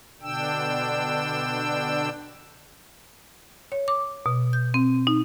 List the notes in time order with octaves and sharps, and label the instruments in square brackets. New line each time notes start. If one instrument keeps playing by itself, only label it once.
[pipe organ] B2 D3 D4 G5 E6
[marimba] C#5
D6
B2
G6
C4
D#4